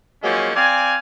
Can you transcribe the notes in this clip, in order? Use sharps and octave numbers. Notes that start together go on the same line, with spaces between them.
F3 F#3 G#3 A#3 C#4 D#4
C4 D5 F5 G#5